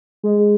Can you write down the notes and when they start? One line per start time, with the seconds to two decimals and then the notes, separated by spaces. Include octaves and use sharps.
0.23 G#3